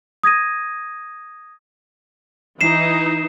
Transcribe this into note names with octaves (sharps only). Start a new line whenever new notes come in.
D#6 G#6 A#6 D#7
E3 D#4 C7 E7